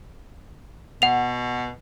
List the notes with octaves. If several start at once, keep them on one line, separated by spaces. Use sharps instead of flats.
B2 F#5 F7